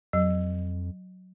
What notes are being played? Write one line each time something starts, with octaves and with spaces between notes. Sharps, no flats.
F2 F#3